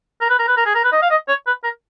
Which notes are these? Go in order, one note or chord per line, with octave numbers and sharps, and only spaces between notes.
A#4
B4
A#4
B4
A#4
G#4
A#4
B4
D#5
F5
D#5
C#5
B4
A#4